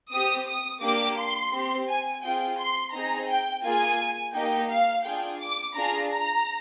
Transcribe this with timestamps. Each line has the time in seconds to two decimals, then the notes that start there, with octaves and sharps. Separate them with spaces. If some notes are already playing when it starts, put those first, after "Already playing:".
0.12 C4 G4 D#6
0.48 D#6
0.82 A#3 D4 G4 D6
1.18 C6
1.53 C4 G4
1.88 G#5
2.23 C4 F4 G#4 G5
2.58 C6
2.93 C4 D#4 G#4 A#5
3.28 G5
3.64 A#3 F4 G#4 G#5
4.34 A#3 D#4 G4 G5
4.70 F5
5.05 D4 F4 G#4 G5
5.41 D6
5.75 D4 F4 G#4 A#5
6.11 A#5